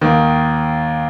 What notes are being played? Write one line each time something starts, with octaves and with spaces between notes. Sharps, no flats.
D#2 D#3